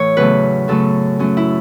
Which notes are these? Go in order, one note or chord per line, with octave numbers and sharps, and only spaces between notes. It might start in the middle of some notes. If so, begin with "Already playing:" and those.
Already playing: A2 E3 C#5
E2 C#3 F#3 A3 B4
F#2 C#3 F#3 A3 A4
F#2 F#3 A3 C#4
E4